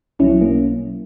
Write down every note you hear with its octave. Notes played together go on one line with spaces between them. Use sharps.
B1 B2 F#3 C#4 E4
A#3 C#4